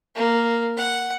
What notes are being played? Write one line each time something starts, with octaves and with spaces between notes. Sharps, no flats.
A#3
F#5